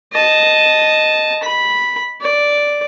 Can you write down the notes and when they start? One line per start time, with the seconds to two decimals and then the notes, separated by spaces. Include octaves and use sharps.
0.13 D#5 A5
1.43 B5
2.21 D5